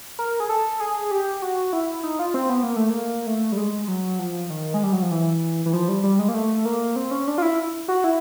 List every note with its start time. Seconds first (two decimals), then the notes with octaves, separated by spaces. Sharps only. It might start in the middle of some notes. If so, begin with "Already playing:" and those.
0.19 A#4
0.40 G#4
0.49 A4
0.80 G#4
1.11 G4
1.42 F#4
1.73 E4
2.03 D#4
2.19 F4
2.34 C4
2.50 B3
2.63 A#3
2.76 A3
2.90 A#3
3.27 A3
3.52 G3
3.57 G#3
3.88 F#3
4.19 F3
4.50 D#3
4.74 G#3
4.83 G3
4.92 F#3
5.02 F3
5.11 E3
5.66 E3
5.73 F3
5.88 G3
6.03 G3
6.19 G#3
6.29 A#3
6.34 A3
6.65 A#3
6.96 C4
7.11 C#4
7.27 D4
7.38 F4
7.42 E4
7.88 F#4
8.04 E4